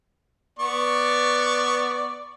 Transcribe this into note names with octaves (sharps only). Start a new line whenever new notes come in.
B3 D5 C#6